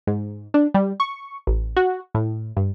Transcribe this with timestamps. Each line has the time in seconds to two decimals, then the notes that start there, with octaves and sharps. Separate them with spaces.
0.07 G#2
0.54 D4
0.74 G3
1.00 C#6
1.47 A1
1.76 F#4
2.15 A2
2.57 G2